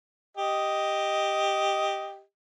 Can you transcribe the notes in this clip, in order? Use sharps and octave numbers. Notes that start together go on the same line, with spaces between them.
G4 D#5